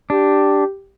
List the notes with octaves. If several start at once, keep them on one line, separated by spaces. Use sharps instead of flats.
D4 G4